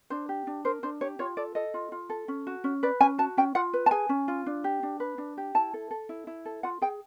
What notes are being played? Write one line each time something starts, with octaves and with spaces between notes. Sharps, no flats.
D4 C5
G4
D4
A#4 C5
D4 C5
G4 C#5
F4 C#5
A4 D5
A4 D#5
F4
F4
A4
C#4
F#4
C#4
B4 D5
C#4 G#5
F#4 A5
C#4 G5
F4 F#5
B4
A5
G#4 G#5
C#4
F4
D4
G4
D4
B4
D4
G4
E4 A5
A4
A4
E4
E4
A4
F4 F#5
G#4 G5